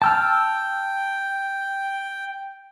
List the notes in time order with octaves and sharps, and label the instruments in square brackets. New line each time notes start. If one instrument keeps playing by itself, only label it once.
[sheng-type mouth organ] G5 [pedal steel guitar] A5 E6 F6